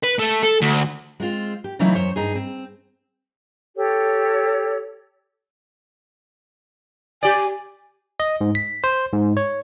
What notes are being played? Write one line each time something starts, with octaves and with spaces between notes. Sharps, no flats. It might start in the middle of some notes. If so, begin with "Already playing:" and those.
B4
A3
A4
D2
G#3 C4 F4
G4
C#3 E3 F#3 A3 D#4 E4
F#2 C5 C#5
G2 D#4 G#4
C4
G4 A4 C#5
G4 D5 G#5
D#5
G#2
B6
C5
G#2
C#5